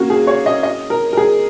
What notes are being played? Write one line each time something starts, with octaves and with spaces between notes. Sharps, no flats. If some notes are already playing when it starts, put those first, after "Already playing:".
Already playing: A#3 C#4 F#4
G#4
C#5
D#5
D#5
A#4
A#4
G#4